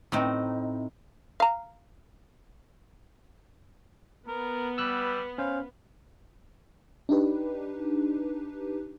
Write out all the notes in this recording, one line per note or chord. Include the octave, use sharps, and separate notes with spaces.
A2 C4 D#4
F5 A#5
B3 A#4
G3 E6 F#6
C#4 C5 F5
D4 D#4 G4 B4